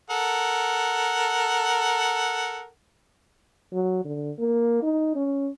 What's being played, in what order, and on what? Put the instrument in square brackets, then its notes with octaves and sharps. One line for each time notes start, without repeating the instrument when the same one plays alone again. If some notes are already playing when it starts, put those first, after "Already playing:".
[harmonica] A4 A#4 F#5
[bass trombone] F#3
D3
A#3
D#4
C#4